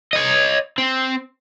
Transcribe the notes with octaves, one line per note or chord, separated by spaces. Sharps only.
C#5 D#5
C4